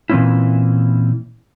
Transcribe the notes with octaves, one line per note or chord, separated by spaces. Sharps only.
A#2 E3 G3 C4 C#4 E4